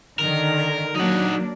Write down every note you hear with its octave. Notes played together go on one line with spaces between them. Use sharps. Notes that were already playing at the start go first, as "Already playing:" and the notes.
D3 D#3 A#4
F#3 A#3 D4 D#4 F#5